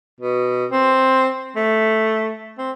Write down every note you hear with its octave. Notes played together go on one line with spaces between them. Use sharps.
B2
C4
A3
C4